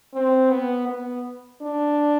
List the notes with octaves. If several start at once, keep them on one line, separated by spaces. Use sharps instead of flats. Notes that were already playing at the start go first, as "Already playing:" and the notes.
C4
B3
B3
D4